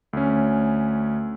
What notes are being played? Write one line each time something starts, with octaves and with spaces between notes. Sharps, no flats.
D2 C#4